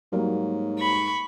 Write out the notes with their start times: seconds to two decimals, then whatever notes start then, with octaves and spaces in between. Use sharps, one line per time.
0.13 G#2 F#3 G3 A#3
0.79 B5 C#6